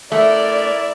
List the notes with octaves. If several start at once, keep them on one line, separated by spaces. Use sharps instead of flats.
A3 E4 A#4 D5